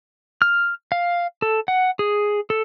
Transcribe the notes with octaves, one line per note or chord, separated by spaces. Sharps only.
F6
F5
A4
F#5
G#4
A4